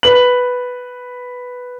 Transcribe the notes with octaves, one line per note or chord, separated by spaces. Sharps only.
B4 F#7